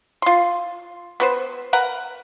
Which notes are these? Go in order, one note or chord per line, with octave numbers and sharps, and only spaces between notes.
F4 C6
B3 B4 C5
A#4 B4 F#5